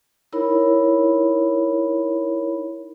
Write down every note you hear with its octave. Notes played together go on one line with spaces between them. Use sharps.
D#4 E4 A#4 C#5 B5